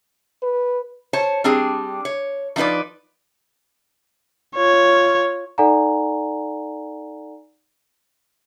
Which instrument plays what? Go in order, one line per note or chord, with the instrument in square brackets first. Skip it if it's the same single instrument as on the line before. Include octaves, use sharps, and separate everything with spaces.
[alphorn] B4
[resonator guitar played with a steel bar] C5 C#5 A5
G3 C4 D4 G#4
C#5
F3 D4 D#4 B4 D5
[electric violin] F4 C#5
[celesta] D#4 A4 D5 F#5 G#5 A#5